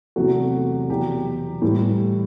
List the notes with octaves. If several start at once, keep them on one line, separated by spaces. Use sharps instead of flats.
E2 C3 F#3 A3 F#4
E2 B2 F#3 G4
A2 E3 G3